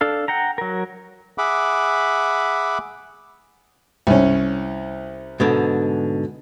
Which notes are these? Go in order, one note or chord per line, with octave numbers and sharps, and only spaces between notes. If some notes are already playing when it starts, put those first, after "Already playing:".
D4 A4 F5
F#5 G5 A#5
F#3 A#4
G#4 E5 F#5 B5 D6
C2 C#4
G#2 B2 D3